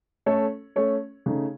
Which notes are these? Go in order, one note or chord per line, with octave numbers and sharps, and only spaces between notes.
A3 C#4 A4 C#5
A3 C#4 A4 C#5
C#3 A3 D#4